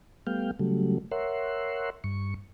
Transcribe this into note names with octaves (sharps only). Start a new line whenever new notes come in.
G3 A3 B3 F5 G5
C#3 F#3 G3 A3
A#4 C#5 E5 F#5 C6
G2 C#6